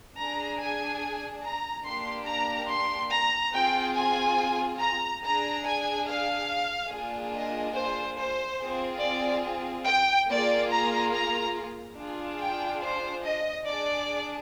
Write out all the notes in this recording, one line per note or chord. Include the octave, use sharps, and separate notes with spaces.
D4 G#4 A#5
G#5
A#5
A#3 D4 G4 C6
A#5
C6
A#5
C4 F4 G#4 G5
G#5
A#5
D4 G#4 A#5
G#5
F5
A#3 D4 F4 G#4
D#5
C5
C5
C4 F4 G#4
D5
G5
A#3 F4 G#4 D5
A#5
A#5
D4 F4 G#4
G5
C5
D#5
D4 G#4 D5